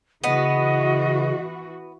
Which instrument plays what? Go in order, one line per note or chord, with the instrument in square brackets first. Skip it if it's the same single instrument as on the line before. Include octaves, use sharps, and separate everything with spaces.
[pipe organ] C#3 [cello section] E3 F#4 [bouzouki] B3 [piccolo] D#5